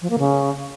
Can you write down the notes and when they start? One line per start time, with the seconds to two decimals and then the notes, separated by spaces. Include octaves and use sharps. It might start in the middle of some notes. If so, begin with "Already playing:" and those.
0.02 F3
0.10 A#3
0.18 C#3